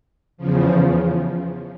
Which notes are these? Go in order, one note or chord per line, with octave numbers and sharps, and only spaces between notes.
E2 C#3 F3